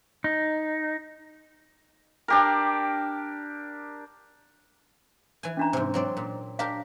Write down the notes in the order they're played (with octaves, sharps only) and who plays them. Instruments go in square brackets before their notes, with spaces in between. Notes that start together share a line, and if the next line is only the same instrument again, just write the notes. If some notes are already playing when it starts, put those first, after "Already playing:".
[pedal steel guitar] D#4
[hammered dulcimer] D4 G4 A#4
[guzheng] E3 G#5
[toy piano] C#4 D4 A#5
[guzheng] G#2 C3
F#3 C4 D5
A#2
[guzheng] D4 G4 A#4 [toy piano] F5